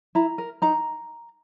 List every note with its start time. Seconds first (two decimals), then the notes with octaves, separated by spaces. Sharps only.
0.15 E4 A#5
0.38 A#4
0.62 D#4 A#5